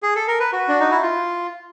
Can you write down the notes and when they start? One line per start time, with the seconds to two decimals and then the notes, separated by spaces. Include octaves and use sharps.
0.03 G#4
0.16 A4
0.28 A#4
0.40 B4
0.52 F#4
0.68 D4
0.80 D#4
0.91 E4
1.02 F4